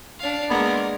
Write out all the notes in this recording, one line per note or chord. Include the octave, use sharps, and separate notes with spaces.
D4 F5
G#3 A#3 B3 D4 A#4